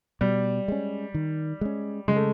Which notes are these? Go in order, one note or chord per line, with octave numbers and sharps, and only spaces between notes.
B2 G3
G#3 C#4
D#3
G#3 C#4
C#3 G#3
A3